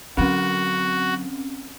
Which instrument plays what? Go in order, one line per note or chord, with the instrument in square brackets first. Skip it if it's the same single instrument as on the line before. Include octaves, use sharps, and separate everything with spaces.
[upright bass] D3 F#3 [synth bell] C4 C#4 [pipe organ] F#4